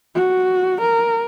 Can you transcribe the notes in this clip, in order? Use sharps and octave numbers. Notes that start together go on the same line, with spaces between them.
F#4
A#4